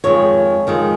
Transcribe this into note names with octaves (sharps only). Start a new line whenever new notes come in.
F2 D#3 G#3 C#5
F2 D#3 G#3